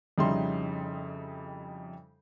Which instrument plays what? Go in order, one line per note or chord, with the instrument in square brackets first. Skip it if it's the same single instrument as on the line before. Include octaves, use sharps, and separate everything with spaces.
[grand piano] F2 C#3 G3 D#4 E4 C6